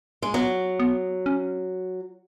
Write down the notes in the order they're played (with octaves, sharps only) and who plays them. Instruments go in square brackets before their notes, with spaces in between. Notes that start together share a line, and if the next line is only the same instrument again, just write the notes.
[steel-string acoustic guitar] G#3
[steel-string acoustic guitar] F#3 [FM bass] B3
[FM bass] B3
C#4